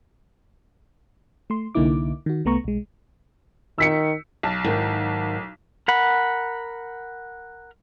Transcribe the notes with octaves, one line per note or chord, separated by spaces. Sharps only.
A3 C6
C2 D3 A#3 D#4 E4 D6
D#3 F#4
C2 A3 B3 A#5 C#6
B1 G#3
D#3 E6 B6 C#7
B1 A5
G#2 D#3
A#4 F#5 B5